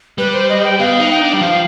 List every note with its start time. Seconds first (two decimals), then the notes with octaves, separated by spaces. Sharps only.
0.18 G3 B4
0.33 C5
0.49 D#5
0.64 G5
0.79 B3 F5
1.00 D#4
1.11 G5
1.21 D4
1.33 G3
1.41 F3 F5